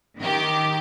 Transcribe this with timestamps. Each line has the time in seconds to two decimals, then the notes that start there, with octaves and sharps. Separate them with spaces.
0.18 D#3 G4